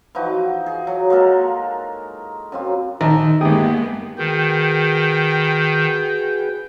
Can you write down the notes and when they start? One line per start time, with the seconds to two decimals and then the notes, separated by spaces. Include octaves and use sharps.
0.15 E3 F3 D#4 F#4
0.66 G#4
0.87 F#3
1.10 G#3 A#3 A4 A#4
2.52 F#2 C4 F4
3.01 A#1 D#3 D#4 A5 A#5
3.41 G1 G#3 A#3 B3 G4 G#4 G5 D#6
4.18 D#3 F#4 G#4 B4 G5